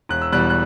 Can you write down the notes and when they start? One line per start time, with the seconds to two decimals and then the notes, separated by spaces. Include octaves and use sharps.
0.09 E1 F#6
0.22 E6
0.32 E2 B2 G3 F#6
0.50 F#6